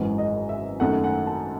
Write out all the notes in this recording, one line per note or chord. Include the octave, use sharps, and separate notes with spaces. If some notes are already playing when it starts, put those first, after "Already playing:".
Already playing: G#1 F#2 E3 G#3
D#5
E5
F#2 D#3 A3 C#4 F#5
F#5
A5